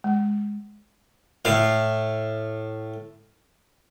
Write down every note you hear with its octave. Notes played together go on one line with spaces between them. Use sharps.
G#3
A2 F5